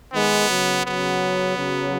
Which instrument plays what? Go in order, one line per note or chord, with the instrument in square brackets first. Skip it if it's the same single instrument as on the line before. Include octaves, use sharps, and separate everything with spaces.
[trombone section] D#3 G#3 [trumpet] B3
[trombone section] C#3 F#3
[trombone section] C#3 F#3 [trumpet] B3
[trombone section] C#3 F#3